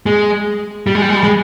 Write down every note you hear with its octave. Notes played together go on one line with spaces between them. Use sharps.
G#3
G3
G#3
G3
G#3
G3
G#3